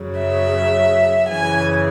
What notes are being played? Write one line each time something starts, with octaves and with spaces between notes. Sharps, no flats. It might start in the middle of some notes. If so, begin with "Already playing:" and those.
Already playing: F#2 C#3 F#3
E5
F#2 C#3 E3 G#5